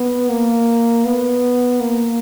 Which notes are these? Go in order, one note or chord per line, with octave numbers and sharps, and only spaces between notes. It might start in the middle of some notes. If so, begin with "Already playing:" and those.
Already playing: B3
A#3
B3
A#3